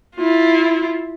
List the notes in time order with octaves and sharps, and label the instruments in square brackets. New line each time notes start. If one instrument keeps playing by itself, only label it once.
[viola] E4 F4